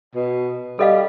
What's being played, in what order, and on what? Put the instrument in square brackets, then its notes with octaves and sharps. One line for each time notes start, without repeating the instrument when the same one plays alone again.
[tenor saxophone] B2
[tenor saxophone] G3 [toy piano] A4 D#5 F5